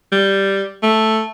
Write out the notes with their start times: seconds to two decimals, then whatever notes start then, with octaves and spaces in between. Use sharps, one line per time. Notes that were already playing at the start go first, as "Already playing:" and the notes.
0.12 G3
0.83 A3